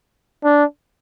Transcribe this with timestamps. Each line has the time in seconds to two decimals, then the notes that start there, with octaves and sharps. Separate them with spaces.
0.44 D4